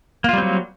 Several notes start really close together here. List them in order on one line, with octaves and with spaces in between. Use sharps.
A#3 F4 G3 C4 F#3